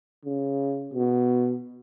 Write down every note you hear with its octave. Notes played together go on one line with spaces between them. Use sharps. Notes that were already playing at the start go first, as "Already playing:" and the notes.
C#3
B2